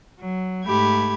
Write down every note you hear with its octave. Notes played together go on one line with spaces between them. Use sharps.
F#3
G#2 A3 G4 B5 G#6